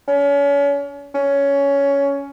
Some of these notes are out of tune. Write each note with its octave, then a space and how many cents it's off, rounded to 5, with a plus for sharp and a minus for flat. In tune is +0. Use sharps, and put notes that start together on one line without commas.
C#4 +35
C#4 +15